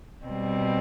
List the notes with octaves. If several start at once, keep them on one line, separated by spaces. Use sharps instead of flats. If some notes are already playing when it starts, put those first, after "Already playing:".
B2 G3 C4